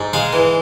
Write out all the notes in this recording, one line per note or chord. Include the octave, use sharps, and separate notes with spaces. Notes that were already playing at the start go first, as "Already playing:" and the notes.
Already playing: G#2
G#3 F5
E3